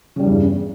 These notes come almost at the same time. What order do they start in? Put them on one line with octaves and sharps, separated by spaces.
C#3 G3 G2 E2